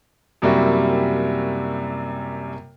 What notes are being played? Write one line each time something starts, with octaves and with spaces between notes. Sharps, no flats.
F#2 C3 G3 A#3 E4 F#4